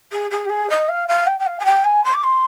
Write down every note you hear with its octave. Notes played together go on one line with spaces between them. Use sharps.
G#4
G#4
G4
G#4
D#5
F5
F5
G5
G5
F5
G#5
G5
G#5
C6
D6
C6